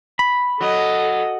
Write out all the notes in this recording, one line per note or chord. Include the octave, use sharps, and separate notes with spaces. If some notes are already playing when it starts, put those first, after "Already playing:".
B5
F#3 A4 D#5